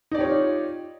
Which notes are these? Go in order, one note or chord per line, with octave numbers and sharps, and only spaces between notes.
D#4 F4 G4 C#5 D5